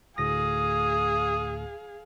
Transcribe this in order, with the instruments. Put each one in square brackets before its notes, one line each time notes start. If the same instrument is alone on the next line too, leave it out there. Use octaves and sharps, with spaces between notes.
[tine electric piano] D2 A2 A#6 [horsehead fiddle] G#4 F5 [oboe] D#6